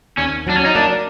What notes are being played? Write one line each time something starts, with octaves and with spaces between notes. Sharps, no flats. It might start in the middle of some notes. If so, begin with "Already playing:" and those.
D#2 C#4
F#3 D4
C#4
D#4
A#3 D4